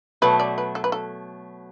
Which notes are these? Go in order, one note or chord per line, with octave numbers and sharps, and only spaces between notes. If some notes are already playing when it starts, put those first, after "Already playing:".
B2 F#3 A3 B4
D5
B4
A4
B4
A4